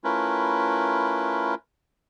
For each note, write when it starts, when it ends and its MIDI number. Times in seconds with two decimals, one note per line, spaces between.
0.04 1.55 57
0.04 1.55 61
0.04 1.55 64
0.04 1.55 65
0.04 1.55 70
0.04 1.55 71